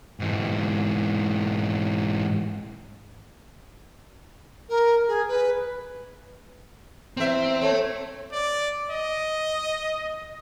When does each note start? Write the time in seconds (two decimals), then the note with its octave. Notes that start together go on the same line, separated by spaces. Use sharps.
0.20 G#2 E3
4.69 A#4
5.08 G#4
5.28 B4
7.17 E2 C4 E5
7.62 A3 C#5
8.32 D5
8.91 D#5